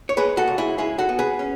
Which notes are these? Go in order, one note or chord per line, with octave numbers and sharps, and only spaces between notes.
C#5
G#3 G#4 B4
F#4 A4
C#2
E4 G#4
G#3 E4 G#4
F#4 A4
B3
G#4 B4
C#4